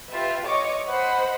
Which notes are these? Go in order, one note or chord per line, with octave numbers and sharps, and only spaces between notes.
F4 G4 B4 E5
C#5 D#5 C#6 D6
C5 D#5 F#5 B5